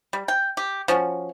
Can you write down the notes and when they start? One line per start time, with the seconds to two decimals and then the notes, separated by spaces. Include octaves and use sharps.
0.13 G3
0.28 G5
0.57 G4
0.88 F3 C#4 F#4